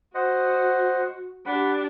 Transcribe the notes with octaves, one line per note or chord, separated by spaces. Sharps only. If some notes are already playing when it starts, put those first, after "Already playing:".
F#4 C5 D#5 F#5
D4 G4 F#5 B5